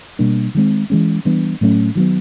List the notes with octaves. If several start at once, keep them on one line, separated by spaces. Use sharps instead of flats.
B2 G3 A#3 D4
D#3 G#3 C4
E3 G#3 C#4
E3 G3 B3 D4
A2 F#3 A3 C#4
D#3 F#3 B3